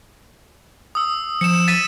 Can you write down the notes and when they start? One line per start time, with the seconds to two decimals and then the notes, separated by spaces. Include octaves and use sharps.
0.95 D#6 E6
1.41 F3 C#7 E7
1.68 A6 B6 D#7